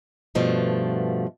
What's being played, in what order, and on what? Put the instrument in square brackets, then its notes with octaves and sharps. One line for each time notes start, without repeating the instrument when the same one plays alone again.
[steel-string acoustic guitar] G2 B2 F3 A3